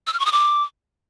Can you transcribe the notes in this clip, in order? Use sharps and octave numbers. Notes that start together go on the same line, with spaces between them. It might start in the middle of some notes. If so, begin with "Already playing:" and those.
E6
F6
C#6
D#6
D6